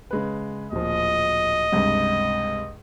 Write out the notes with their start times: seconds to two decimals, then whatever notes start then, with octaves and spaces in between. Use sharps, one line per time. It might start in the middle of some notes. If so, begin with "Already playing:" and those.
0.11 C#3 G#3 B4
0.72 D1 A#2 F3 D#5
1.72 C#2 G2 C3